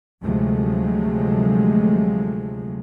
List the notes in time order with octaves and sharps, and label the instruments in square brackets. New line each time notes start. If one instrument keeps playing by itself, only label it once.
[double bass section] D2 C3 F3 F#3 G#3 A3